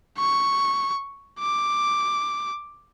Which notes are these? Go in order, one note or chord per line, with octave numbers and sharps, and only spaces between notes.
C#6
D6